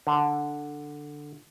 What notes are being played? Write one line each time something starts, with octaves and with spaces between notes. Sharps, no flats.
D3